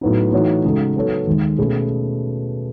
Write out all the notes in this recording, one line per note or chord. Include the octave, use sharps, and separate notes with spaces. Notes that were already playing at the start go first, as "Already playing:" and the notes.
A2 F#3 B3 D#4
E3 A3 D#4 F#4 C#5
C#3 G#3 D#4 F#4 A4
F#3 B3 D#4 A4 C#5
D#2 D#3 G#3
B2 A3 C#4 G#4 B4